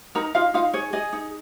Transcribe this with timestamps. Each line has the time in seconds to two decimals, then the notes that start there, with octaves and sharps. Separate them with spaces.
0.15 D#4 A#4 A#5
0.35 D#4 F4 F5
0.54 D#4 F4 F5
0.73 G#4 C#5
0.93 G#4 D#5
1.13 D#4